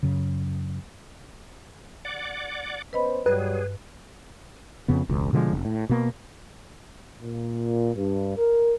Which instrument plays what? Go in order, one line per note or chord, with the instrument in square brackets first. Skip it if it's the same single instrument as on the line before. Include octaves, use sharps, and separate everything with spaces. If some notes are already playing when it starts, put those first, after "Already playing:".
[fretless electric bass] F#2 C#3
[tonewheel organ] D5 F#5 D6
[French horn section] B3 C#4 C5 [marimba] B4 D#5 B5
[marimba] G2 [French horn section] F#3 G3 [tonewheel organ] G#4 [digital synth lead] B4
[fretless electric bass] F2 C#3 B3
E1 C#2
B2 D3 F3 G#3
F1
A2
B2 A#3
[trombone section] A#2
G2
A#4